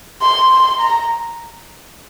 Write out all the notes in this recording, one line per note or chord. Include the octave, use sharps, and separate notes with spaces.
C6
C6
A#5